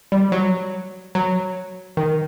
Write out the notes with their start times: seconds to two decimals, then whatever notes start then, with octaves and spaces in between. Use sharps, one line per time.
0.12 G3
0.32 F#3
1.15 F#3
1.97 D#3